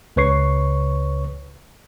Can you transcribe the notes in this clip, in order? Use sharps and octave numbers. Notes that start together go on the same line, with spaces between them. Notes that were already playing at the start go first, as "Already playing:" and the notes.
C#2 C#3 B4 C#5 C#6 C7